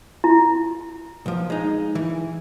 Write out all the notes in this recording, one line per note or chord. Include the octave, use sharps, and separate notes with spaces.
E4
B1 F3
G#3 D#4
E3